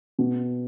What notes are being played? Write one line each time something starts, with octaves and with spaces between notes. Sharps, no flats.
B2